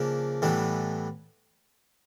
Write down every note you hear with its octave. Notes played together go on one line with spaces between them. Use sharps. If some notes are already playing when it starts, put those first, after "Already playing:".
Already playing: C#3 F3 A#3 D4
A2 E3 G3 B3 D4